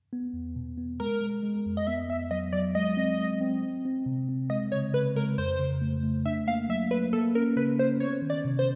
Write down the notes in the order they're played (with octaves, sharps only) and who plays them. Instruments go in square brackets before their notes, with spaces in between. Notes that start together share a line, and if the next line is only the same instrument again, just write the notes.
[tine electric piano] B3
E2
B2
B3
[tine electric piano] G#3 [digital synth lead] A#4
[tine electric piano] G#3
G#3
F2
[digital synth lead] D#5
[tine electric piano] B3 [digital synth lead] E5
[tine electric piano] B3 [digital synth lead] E5
[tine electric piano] F#3 [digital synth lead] D#5
[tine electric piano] F#3 [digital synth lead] D5
[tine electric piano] G#3 [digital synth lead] D#5
[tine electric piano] C4
G#3
C4
C4
C4
C3
C4
[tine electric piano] G#3 [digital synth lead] D#5
[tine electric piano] C#3 [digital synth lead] C#5
[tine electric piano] C#3 [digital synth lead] B4
[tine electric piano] G#3 [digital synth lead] A#4
[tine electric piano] F2 [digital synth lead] C5
[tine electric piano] C#3
A3
A3
[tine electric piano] D4 [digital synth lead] E5
[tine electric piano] A#3 [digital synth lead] F5
[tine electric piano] F#3 [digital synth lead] E5
[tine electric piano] A#3 [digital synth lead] B4
[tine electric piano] A#3 [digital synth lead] A4
[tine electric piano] C#4 [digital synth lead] A#4
[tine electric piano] C#3 [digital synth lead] B4
[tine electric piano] C#4 [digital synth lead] C5
[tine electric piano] B3 [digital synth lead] C#5
[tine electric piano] D#3
[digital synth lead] D5
[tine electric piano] C3
[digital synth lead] C5